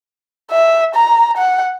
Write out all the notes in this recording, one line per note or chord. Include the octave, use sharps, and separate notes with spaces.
E5
A#5
F#5